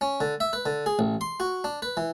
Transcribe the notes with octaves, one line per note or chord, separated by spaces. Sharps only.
C#4
D3
E5
B4
D3
G#4
A1
C6
F#4
D4
B4
E3